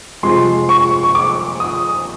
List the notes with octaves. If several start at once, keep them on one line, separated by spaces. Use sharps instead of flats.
F2 C3 F3 G#3 C6
C#6
C#6
D6
D#6